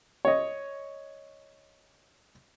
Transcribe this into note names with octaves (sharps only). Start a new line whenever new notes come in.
C#5 D#5